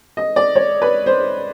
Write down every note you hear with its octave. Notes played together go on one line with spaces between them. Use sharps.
D#5
D5
C#5
B4
C5